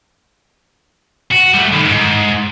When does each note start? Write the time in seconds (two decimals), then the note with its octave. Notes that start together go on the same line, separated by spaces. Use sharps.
1.32 F#4
1.54 G3 A3
1.73 A2 D#3
1.88 G#2